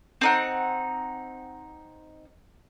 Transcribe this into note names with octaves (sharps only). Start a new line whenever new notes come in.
C4 D#4 F#5